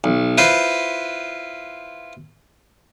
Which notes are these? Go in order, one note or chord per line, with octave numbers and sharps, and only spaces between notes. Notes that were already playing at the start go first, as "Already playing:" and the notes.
B1
E4 F4 B4 C5